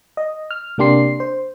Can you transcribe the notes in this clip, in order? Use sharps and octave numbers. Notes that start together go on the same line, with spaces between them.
D#5
F6
C3 A#3 D4 G4 C6 C7
C5